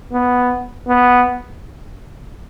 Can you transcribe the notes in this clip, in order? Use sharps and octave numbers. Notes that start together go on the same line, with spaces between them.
B3
B3